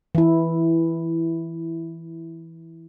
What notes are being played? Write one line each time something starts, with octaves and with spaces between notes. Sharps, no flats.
E3 E4